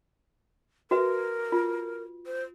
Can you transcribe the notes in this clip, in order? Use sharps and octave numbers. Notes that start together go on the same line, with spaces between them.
F#4 A#4 B4 E5
F4
C5